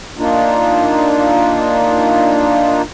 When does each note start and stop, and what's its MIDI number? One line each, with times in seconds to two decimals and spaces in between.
0.18 2.82 58
0.18 2.82 62
0.18 2.82 63
0.18 2.82 65